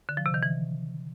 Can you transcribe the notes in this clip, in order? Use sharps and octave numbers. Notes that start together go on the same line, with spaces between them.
D3
F3
C3
D#3
E3